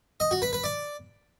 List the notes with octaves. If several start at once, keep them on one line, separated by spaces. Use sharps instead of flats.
D#5
F#4
B4
B4
D5